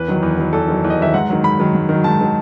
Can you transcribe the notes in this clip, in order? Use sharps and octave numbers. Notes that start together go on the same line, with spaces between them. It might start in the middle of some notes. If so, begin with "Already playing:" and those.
Already playing: E2 B4
D#3 F#3
E2
D#3 F#3
E2 A4
D#3 F#3
E2
D#5
D#3 F#3 E5
G#2 F#5
D#3 F#3
G#2 B5
D#3 F#3
G#2
D#3
F#3
G#2 A5
D#3 F#3